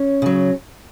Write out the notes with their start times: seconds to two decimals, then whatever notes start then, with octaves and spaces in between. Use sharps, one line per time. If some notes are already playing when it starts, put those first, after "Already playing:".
Already playing: C#4 C#5
0.22 C#3 F#3